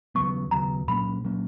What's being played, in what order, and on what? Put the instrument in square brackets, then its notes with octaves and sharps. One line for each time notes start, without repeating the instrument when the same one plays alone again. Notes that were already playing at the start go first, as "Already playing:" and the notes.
[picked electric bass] D#2 C#3 F#3 B3 [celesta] C#6
[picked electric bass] D#2 C#3 F#3 B3 [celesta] A#5
[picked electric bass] A#2 F#3 A#3 C#4 [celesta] B5
[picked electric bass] A#2 F#3 A#3 C#4